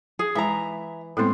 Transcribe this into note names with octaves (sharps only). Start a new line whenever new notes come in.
G#4
E3 G#3 E5 A#5
A2 G#3 B3 C4 C5